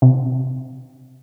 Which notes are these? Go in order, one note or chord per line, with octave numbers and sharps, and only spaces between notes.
C3